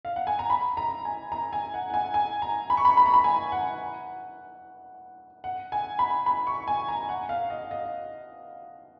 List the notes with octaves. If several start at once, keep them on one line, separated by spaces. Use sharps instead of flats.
F5
F#5
G#5
A#5
B5
A#5
G#5
A#5
G#5
F#5
F#5
G#5
G#5
A#5
B5
C#6
B5
B5
A#5
B5
G#5
F#5
F#5
G#5
B5
B5
C#6
G#5
A#5
F#5
F5
D#5
D#5